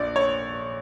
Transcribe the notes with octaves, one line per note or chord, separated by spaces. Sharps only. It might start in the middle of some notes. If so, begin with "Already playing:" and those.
Already playing: A#1 D5
C#5